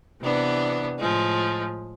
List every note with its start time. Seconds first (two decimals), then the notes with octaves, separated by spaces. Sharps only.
0.21 C3 E3 B3 D4
0.99 A2 F3 G#3